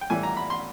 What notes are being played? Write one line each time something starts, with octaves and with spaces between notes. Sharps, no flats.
G5
A2 E3 G3 G#5
A#5
B5
C6